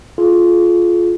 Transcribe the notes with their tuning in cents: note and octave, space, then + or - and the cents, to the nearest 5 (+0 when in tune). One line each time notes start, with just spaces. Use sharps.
F4 +0 G#4 +40